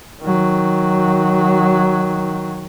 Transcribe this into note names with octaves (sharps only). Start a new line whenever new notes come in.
D#3 F#3